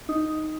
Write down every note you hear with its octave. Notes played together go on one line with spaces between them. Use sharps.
D#4